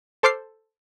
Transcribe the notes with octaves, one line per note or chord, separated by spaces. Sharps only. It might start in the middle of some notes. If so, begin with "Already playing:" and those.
A4 C5 D6 F6 C7